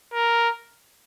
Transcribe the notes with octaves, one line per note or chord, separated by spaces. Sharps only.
A#4